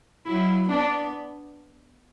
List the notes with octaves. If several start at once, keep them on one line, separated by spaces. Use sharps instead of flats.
F#3 E4
B3 D4